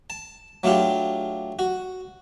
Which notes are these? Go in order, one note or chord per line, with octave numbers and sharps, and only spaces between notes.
A5
F#3 A3 D4 F4 G4
F#4